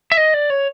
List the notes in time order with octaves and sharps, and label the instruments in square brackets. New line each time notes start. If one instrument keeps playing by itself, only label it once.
[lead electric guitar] E5
D#5
D5
C#5